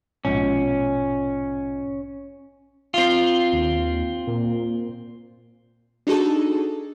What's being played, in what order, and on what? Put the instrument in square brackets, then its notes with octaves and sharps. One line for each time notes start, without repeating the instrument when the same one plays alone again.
[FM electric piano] A#1 G#2 B2 [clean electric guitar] C#4
[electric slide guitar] C4 F4
[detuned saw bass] D#2
A#2
[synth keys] D4 D#4 F#4 G#4 A4 A5